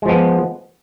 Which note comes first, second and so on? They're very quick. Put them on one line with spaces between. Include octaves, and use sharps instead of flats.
G#3 F3 B3